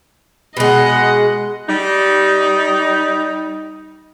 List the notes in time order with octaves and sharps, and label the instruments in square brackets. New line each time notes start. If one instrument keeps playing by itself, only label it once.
[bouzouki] B2 G#3 [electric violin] D#5 F#5
[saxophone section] G3 D#4